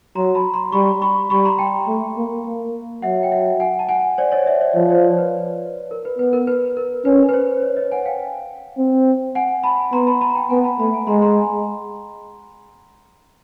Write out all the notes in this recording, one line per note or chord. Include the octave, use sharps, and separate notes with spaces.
F#3 A#5 C6
A5 B5
A#5 C6
G3 B5 C#6
B5 C#6
G3 B5 C#6
A#5 C6
G5 A5
A3
A#3
A#3
F#3 E5 F#5
G5
E5 F#5
F#5 G#5
A5
F#5 G#5
C5 D5
C#5 D#5
D5 E5
C5 D5
F3 C#5
C5 D5
C#5
B4
A#4
B4
B3 B4
A#4
B4
A#4
C#4 B4
B4
C5
C#5
C#5 D#5
F#5 G#5
F5 G5
C4
F#5 G#5
A5 B5
B3 A#5 C6
A5 B5
A5 B5
A#5
G5 A5
B3 F#5 G#5
A5 B5
A3 A5 B5
G#5 A#5
G#3 A#5 C6
A#5 C6